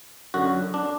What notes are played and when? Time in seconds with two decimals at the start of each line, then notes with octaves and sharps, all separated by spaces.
0.34 F#2 D3 F#4
0.74 D4